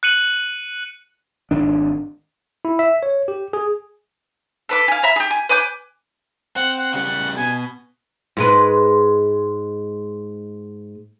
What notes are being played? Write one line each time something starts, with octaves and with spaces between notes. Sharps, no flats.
F#6 C#7 D#7 F#7
G#1 D#3 D4
E4
E5
C#5
G4
G#4
A4 B4 D6
F5 G#5
E5 A#5 B5
G4 G#4
G#5
B4 G#5 D6 G6
C4 F#5
F#5
C#3 G3 F#5
B2 G#5
G#2 G#3 B4